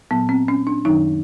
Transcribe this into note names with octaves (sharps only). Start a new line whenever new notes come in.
A#2 F#3 B3
C4
C#4
D4
F#2 D#3 F#3 D#4